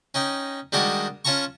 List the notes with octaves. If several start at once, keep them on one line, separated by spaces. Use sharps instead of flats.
C#4 D#4 G5
D#3 G3 G#3 D4 F#4 D#5
C#4 F4 A5 A#5 C#6